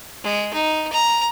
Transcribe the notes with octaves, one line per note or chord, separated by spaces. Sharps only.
G#3
D#4
A#5